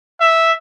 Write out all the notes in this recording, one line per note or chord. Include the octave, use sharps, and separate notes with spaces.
E5